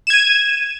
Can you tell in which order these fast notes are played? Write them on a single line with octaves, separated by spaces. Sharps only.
E7 G#6 D#7